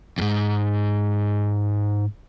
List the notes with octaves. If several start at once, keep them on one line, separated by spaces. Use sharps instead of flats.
E2 G#2